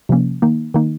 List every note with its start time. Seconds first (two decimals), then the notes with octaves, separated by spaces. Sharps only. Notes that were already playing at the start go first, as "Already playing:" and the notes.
0.09 C3 F3 A#3 C#4
0.42 D#3 A#3 D#4
0.74 D#3 A#3 D#4